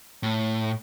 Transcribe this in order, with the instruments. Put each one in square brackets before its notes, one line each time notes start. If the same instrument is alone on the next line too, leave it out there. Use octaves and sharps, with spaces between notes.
[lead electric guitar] A2